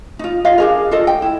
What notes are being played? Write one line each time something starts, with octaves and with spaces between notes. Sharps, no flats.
D#4 F4
F4 D#5 F5
D4 G#4 A#4
F4 A4 D#5
G5
E4